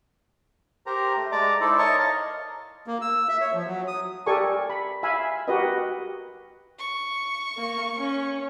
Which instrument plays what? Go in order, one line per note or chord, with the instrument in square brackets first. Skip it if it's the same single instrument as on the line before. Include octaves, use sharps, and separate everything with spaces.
[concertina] G4 A#4 C5 A#5
A3
G#3 D5 A5 A#5 D6
D#4 E4 A4 C5 D5
A#4 C#5 D#5 A5 C#6
D#5 F5 A5
[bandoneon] A#3
E6
E5
C#5
F3
F#3
D#6
[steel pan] G4 A4 A#4 D5 G#5 C#6
B5
E5 F5 G#5 B5
F#4 G4 A#4 B4 D#5
[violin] C#6
[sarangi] A#3
C#4